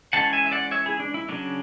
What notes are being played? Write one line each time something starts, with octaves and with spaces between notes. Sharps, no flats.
E3 G#3 C#4 F#5 A5
E5 G#5
E5
D5 F#5
C#5 E5
E4 G#4
D4
E4
C#3 F#3 A3 C#4 D4